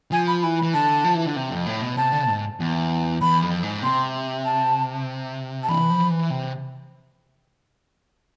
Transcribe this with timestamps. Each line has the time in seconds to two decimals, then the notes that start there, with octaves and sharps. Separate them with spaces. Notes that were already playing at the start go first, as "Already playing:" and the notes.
0.12 F3 G#5
0.27 B5
0.42 E3 B5
0.58 B5
0.62 E3
0.74 D3 A5
1.04 F3
1.15 E3
1.25 D3
1.36 C3
1.50 F2
1.66 A2
1.82 B2
1.97 C3 A5
2.12 D3
2.28 G#2
2.60 E2
3.21 E2 B5
3.42 F2
3.63 G#2
3.83 C3 C6
4.45 A5
5.63 A5
5.68 E3 B5
5.90 F3
6.10 E3
6.30 C3